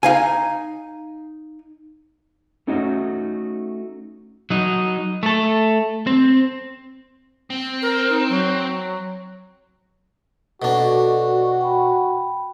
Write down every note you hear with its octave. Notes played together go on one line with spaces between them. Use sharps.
D#4 F5 G#5
A3 C#4 D#4 F#4 A4 D#5
F#3 D#4
A3 A4
C4
C4
A#4
D#4
F#3
B2 D4 F#4 A4 D5 D#5
G5 B5